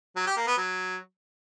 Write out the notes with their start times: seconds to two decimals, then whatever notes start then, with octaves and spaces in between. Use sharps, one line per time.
0.16 F#3
0.26 G4
0.37 A#3
0.47 B3
0.57 F#3